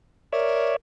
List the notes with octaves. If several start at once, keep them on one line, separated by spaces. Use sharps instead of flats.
A#4 C#5 D5 E5